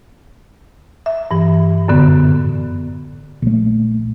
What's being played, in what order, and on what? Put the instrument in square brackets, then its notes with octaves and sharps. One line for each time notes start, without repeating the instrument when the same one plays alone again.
[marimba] E5
G2 E3
F#2 A2 D3 B3
[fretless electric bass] A#1 A3